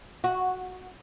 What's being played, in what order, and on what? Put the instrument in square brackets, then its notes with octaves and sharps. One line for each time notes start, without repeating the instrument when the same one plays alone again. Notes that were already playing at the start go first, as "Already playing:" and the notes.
[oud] F#4